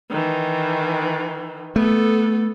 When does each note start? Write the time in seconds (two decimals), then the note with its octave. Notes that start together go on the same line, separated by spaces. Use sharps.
0.11 D#3 E3
1.76 A3 B3 A4